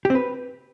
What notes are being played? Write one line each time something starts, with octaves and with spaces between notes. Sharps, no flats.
G4
C4
B4